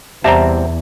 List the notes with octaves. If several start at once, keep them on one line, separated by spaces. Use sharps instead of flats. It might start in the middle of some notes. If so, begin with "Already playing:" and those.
E2 C3 G3 C4 E5 F#5 A5 A#5